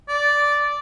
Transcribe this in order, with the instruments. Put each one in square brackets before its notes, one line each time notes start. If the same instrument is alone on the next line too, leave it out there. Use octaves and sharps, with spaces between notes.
[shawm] D5